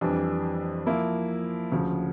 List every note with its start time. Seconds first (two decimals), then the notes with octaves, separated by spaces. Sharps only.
0.01 F2 E3 G3 D4
0.86 F3 A#3 E4
1.71 D2 C#3 F3